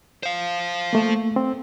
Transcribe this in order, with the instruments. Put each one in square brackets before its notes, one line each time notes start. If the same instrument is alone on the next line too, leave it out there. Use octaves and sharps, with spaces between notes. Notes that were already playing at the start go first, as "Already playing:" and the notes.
[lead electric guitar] C5 F5
[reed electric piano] A3 A#3
C4